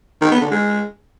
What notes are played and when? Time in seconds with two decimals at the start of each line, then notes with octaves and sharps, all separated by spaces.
0.21 D#3
0.31 B3
0.41 D3
0.51 G#3